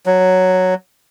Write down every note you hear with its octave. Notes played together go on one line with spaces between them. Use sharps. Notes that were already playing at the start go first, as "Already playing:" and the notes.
F#3